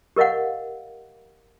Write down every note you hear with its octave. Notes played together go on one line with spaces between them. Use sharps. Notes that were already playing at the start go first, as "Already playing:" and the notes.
G4 A#4 D#5 F5 F#5